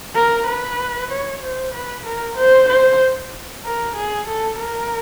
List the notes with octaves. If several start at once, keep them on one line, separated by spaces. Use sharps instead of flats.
A#4
B4
C#5
C5
B4
A#4
C5
C5
A#4
G#4
A4
A#4